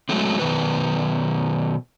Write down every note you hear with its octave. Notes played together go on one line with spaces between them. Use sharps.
F#3 G#3 A3 C4
B2 D#3 B4